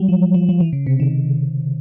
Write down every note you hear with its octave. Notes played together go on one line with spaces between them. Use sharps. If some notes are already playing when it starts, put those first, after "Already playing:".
Already playing: F#3 G3
F3
F3
F3
E3
C#3
C3
D#3